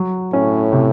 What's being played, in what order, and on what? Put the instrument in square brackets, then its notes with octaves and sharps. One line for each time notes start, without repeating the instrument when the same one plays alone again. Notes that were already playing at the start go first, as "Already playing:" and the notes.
Already playing: [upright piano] F#3
[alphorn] A2 [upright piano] C#4
[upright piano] C3